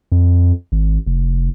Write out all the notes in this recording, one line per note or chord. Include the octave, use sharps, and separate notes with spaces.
F2
G#1
F1